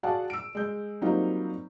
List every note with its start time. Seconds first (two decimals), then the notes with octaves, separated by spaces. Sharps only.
0.03 F#4 G#4 D5 F5 F#5 A5
0.30 E6 D7
0.55 G#3 G6
1.01 F#3 G3 A#3 C4 D#4 F4